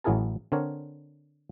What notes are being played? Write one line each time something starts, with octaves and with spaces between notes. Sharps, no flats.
A1 F#3 E4 G#4 A#4 A5
D3 C4 D4 A#4 C#5